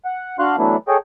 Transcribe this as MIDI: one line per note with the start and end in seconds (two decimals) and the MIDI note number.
0.05 0.37 78
0.39 0.56 62
0.39 0.56 66
0.39 0.56 77
0.39 0.56 84
0.39 0.56 90
0.58 0.76 52
0.58 0.76 54
0.58 0.76 57
0.58 0.76 59
0.58 0.76 62
0.58 0.76 64
0.88 0.97 68
0.88 0.97 69
0.88 0.97 73
0.88 0.97 75
0.88 0.97 79